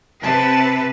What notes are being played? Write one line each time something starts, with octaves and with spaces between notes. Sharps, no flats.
C3 B4 A5